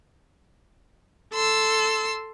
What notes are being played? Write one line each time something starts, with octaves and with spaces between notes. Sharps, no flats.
A4 C6 E6